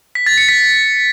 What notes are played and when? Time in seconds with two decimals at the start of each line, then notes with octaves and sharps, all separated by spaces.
0.15 B6
0.26 A6
0.37 C#7
0.49 B6